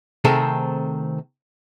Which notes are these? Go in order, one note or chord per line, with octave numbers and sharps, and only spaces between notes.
C3 D#3 A3 C4 G#4 A4